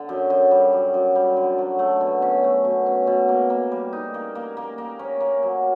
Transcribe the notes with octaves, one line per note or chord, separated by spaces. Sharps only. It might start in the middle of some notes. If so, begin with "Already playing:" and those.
Already playing: D3
F#2
F#2
G3
F#2
F#2
G3
D3
F#3
A3
B2
C#4
A3
B2
C#4
B2
A#3
A#3
G3
D#4
A#3
A#3
A#3
A#3
C#4
A#3
F#3